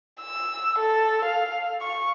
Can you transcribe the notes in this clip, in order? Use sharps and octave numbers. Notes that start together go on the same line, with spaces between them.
E6
A4
F5
C#6